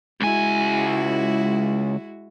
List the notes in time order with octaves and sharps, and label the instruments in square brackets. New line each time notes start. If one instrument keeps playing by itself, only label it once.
[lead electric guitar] C#2 G#5 [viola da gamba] G#3 E4 F#4